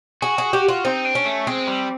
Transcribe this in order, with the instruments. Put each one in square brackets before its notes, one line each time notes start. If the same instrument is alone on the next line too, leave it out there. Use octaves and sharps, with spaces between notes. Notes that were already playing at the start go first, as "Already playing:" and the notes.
[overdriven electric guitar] F#4 [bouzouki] G#4
[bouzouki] G#4
G4
F4
[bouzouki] C4 [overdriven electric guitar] D#4
[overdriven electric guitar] D4
[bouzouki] C#4
[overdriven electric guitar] A3
[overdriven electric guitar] G#3 [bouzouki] C4
[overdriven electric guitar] G3